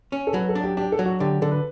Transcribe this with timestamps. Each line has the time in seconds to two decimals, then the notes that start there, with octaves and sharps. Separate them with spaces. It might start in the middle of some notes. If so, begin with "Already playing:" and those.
0.12 C#4
0.27 A4
0.34 F#3 B4
0.49 A4
0.55 D4
0.63 G4
0.77 D4 G4
0.92 A4
0.99 F#3
1.05 F#4
1.20 D3 G4
1.42 D3 A4
1.51 B4